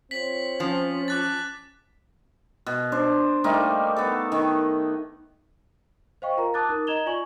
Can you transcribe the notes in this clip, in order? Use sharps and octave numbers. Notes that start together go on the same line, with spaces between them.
C4 F4 C5 C#5 B6 F#7
F3 C#4
D6 F#6 A6
B2
D4 C5
G3 A3 A#3 D#4
B3 A4
D#3
C5 D#5 F5 G5 C#6
F4 A#4 A#5
A5 D6 D#6 F#6 A6
D#4 A#4 D#6
D#5 A#5 G#6 E7 F7 G7
F4 D5 G#5 C#6 F#7